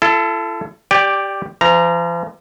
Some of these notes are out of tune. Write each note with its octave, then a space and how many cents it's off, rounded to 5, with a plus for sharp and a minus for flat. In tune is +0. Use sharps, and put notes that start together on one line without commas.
E4 +45 A4 +0
G4 +0 D5 +0 G5 +40
F3 -45 A#5 +0